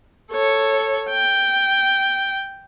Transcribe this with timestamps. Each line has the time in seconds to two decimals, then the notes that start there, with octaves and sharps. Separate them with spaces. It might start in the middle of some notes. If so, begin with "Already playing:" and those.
0.31 A4 C#5
1.10 G5